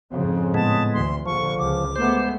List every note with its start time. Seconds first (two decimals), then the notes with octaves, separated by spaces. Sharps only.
0.12 F2 G#2 C#3
0.54 A2 G#3 B3 A5
0.93 D2 E3 C6
1.26 A#1 D3 F3 C#6
1.59 C#2 D6
1.96 G#3 A3 B3 C5